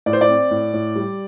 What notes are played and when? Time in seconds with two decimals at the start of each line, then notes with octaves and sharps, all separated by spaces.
0.06 A2 D5
0.13 C5
0.21 D5
0.29 C4
0.51 A2
0.74 A2
0.96 G3